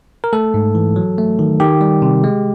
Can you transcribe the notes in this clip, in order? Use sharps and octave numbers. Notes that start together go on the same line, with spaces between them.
A#4
A3 A4
G#2
E3
F#3
A3
D#3
D#3 G4
G3
C3
G#3